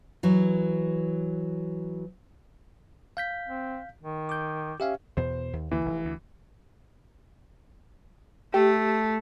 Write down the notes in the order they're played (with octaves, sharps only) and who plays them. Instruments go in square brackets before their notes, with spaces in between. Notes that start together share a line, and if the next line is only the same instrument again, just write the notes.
[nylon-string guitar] E3 F#3
[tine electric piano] F5 G6 B6
[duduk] C4
D#3
[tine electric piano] D6 G6
[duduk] C#4 [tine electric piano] G4 E5 F5
[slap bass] E2 B2 [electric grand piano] C5
[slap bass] D#2
[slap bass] D2 D3 A#3 [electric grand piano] E3
[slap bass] F1
D2
[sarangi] A3 [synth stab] G4